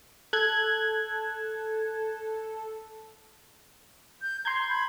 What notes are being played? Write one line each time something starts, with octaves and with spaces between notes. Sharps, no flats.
A4 F#6 G#6
G6
A#5 C6 G6 G#6
B5